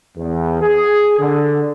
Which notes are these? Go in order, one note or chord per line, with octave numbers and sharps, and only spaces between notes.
E2
G#4
D3